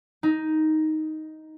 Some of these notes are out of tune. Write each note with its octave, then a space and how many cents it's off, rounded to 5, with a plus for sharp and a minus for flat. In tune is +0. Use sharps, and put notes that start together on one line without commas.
D#4 +5